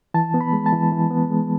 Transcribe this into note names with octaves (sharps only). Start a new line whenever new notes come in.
E3 A5
B3
B5
G#3
A5
E3
E3
B3
G#3